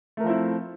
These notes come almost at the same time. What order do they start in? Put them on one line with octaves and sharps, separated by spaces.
A3 A#4 F3 C4 E4